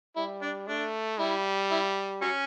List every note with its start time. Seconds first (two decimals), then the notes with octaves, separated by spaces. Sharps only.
0.16 G3 E4
0.42 D4
0.68 A3 D4
1.19 G3 E4
1.71 E4
2.22 F#3 C#4